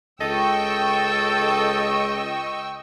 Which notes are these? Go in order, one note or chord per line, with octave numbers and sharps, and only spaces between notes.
C#2 A4 D#5 G5 C#6 E6